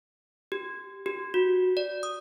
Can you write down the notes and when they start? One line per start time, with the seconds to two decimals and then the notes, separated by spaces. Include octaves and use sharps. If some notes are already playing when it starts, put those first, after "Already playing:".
0.52 G4
1.06 G4
1.34 F#4
1.77 D5
2.03 D#6